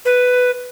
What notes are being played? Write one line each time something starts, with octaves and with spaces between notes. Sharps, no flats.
B4